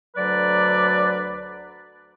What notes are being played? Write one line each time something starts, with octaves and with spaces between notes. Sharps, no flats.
D2 D3 F#3 B4 D5